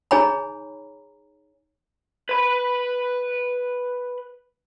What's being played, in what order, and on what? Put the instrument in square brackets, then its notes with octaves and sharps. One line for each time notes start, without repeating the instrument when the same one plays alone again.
[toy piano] D#4 G#4 C#5 G#5 A#5 B5
[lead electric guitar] B4 B5